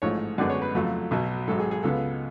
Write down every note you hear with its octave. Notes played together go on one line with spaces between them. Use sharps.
A1 G#2 F3 A3 C#5
F#2 D3 G#3 B3 D5
C#5
B4
F2 C#3 F#3 A3
B1 B2 F#3
G#1 G#2 F#3 A4
G#4
G#4
C#2 C#3 G#3 B3 A4